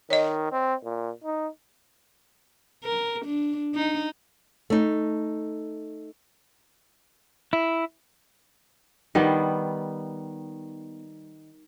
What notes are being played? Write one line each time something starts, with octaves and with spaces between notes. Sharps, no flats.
D#3 C#5 D#5
C4
A#2
D#4
A#4
D4
D#4
A3 D#4
E4
D#3 G3 B3